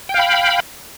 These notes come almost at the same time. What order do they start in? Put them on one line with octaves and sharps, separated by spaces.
G5 F5 B5